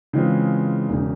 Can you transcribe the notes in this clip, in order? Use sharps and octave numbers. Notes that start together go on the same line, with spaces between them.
C#3 E3 G#3 C4 F4
E1 C#3